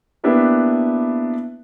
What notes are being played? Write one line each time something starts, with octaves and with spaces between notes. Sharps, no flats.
A#3 B3 D4 E4 G4 B4